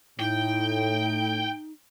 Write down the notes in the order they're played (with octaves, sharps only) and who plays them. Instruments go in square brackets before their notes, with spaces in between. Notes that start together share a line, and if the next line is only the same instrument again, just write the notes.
[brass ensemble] A2 [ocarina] D#4 [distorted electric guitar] G5